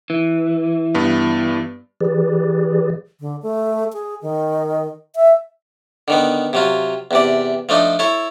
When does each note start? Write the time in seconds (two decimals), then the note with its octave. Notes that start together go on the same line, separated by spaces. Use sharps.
0.10 E3
0.94 G2 B3
2.01 E3 G4 G#4 B4 D5
3.20 D3
3.42 A3
3.93 G#4
4.22 D#3
5.16 E5
6.08 D3 D#3 B3
6.53 C3 F#3 F4
7.11 E2 C3 D5
7.69 F3 A3 D4 D#4
7.99 E4 A4 C#5